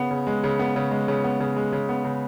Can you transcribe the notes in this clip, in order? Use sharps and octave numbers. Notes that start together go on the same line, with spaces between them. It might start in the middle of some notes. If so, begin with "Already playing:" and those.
Already playing: C#3 B3
C#3
G#3
C#3
B3
C#3
G#3
C#3
B3
C#3
G#3
C#3
B3
C#3